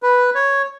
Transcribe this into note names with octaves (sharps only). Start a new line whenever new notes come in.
B4
C#5